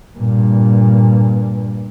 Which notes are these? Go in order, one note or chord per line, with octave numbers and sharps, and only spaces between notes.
G2 A#2